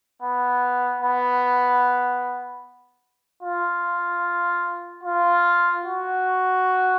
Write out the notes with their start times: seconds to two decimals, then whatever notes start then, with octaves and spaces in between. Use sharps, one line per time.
0.22 B3
1.02 B3
3.43 F4
5.03 F4
5.84 F#4